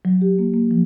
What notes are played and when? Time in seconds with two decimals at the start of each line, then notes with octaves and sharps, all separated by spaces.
0.05 F#3
0.21 G4
0.39 A#3
0.54 A#3
0.71 F3